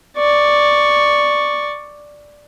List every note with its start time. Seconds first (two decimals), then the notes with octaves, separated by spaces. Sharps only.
0.17 D5 C#6